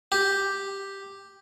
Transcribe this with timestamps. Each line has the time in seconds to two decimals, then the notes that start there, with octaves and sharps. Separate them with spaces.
0.12 G4